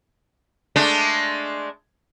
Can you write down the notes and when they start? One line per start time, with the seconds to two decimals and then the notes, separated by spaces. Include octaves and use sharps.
0.76 G#3 A3 D4